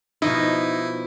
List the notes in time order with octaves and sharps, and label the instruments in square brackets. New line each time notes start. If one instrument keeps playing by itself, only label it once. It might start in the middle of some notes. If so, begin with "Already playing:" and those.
[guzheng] B2 F3 D#5 [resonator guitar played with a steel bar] D#4 [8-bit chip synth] E4